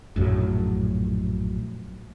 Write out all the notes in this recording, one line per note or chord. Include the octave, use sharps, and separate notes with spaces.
A#1 F#2 A2 F#3